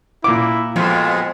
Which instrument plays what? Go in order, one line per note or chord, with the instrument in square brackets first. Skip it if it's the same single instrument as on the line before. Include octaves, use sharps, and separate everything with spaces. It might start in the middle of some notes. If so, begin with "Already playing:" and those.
[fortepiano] A#2 D6 [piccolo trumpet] E4
[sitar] F2 B2 G#3 [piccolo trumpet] F4